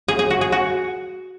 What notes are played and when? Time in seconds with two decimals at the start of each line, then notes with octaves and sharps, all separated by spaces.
0.08 G#4
0.19 G#4
0.30 F#4
0.41 G#4
0.52 F#4